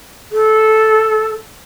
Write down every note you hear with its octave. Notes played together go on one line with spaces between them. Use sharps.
A4